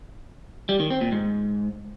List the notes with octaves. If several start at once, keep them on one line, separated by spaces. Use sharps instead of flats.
G3
D#3
C4
A#2
G#2